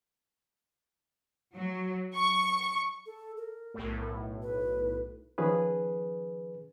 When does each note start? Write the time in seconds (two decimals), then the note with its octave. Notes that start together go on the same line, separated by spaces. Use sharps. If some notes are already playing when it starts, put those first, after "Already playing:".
1.54 F#3
2.15 C#6
3.06 A4
3.37 A#4
3.74 B1 A2
4.43 B4
5.38 D#3 F3 C#4 G#4 B4